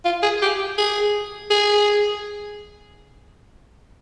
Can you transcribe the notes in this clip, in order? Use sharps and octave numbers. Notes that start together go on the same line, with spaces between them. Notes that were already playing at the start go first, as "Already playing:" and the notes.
F4
G#4
G4
G#4
G#4